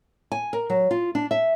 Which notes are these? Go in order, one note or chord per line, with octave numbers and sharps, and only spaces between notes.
G#5
A#4
F#3
F4
D4
E5